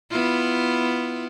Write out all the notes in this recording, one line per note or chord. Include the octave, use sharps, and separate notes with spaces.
B3 E4 F4